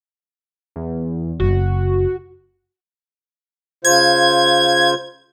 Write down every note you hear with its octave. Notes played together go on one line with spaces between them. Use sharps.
E2
F#1 F#4
C#3 F4 C5 G#6